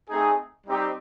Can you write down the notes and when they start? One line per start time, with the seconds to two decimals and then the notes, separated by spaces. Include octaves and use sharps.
0.10 A3 C4 D#4 G#4
0.67 G3 C4 D#4 G4